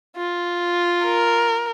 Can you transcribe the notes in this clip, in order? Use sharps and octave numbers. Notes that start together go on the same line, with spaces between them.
F4
A#4